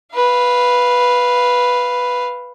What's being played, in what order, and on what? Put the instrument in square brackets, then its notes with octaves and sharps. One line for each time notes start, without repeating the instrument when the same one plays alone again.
[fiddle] B4 F5